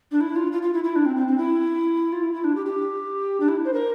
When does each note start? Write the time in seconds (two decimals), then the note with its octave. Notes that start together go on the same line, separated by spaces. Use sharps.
0.11 D4
0.20 E4
0.36 F4
0.52 F4
0.62 F4
0.73 E4
0.84 E4
0.96 D4
1.06 C4
1.16 C4
1.28 C4
1.38 E4
2.12 F4
2.23 E4
2.33 E4
2.44 D4
2.56 G4
2.66 G4
3.40 D4
3.48 E4
3.65 C5
3.73 A#4